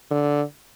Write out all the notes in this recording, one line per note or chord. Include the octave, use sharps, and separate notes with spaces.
D3